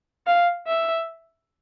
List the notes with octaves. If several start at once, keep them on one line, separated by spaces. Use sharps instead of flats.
F5
E5